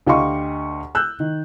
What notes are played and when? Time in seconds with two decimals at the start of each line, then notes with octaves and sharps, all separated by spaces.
0.07 D2 G4 D#5 F5 C6 C#6
0.95 E6 F#6 G6
1.20 D#3